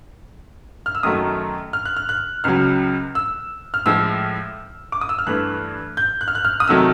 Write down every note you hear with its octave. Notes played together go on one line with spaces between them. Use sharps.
F6
E6
F#2 D#3 F#3 A3 D#6
F6
F#6
F6
F#6
C#2 C#3 F#3 F6
E6
F6
A2 F3 G#3 E6
D6
D#6
E6
F6
G2 E3 A3 F#6
G6
F#6
F6
F#6
F6
D#6
C3 D#3 F#3 A3 E6